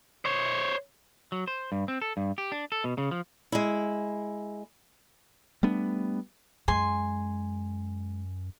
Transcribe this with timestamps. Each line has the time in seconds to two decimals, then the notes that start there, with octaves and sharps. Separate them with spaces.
0.25 C5 C#5
1.32 F#3
1.47 C5
1.72 G2
1.88 C4
2.02 A4
2.17 G2
2.38 G4
2.52 D4
2.72 A4
2.84 B2
2.98 C#3
3.11 F3
3.52 G#3 E4
5.63 G3 A3 B3 D4
6.68 F#2 G#3 G#5 C6